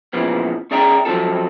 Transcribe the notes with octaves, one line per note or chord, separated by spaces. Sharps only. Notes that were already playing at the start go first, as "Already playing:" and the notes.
A#2 C#3 E3 F3 B3
C#4 G#4 D5 E5 G5 A#5
F3 F#3 G#3 C4 F4 A4